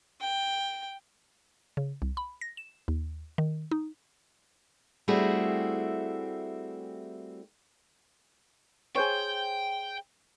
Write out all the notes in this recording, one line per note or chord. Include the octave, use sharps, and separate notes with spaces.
G5
C#3
C2
B5
A#6
E7
D#2
D#3
D#4
G3 A3 C4 E4 F#4 G#4
G#4 C5 C#5 G5